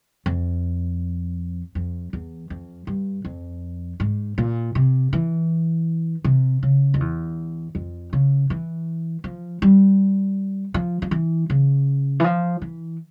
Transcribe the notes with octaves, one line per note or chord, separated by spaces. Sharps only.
F2
F2
E2
F2
G2
F2
G#2
A#2
C3
E3
C3
C#3
F2
E2
F2
C#3
E3
F3
G3
F3
F3
E3
C#3
E3
F3
E3